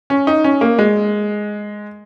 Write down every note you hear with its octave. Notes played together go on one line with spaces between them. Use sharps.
C#4
D#4
C#4
A#3
G#3